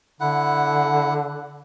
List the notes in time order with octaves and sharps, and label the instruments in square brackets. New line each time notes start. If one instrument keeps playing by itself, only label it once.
[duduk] D3 [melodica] E4 F#5